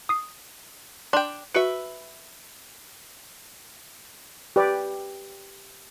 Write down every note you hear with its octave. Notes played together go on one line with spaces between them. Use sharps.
D#6 C7
D4 G5 C6
F#4 B4 E5 C#7 D7
G4 B4 D5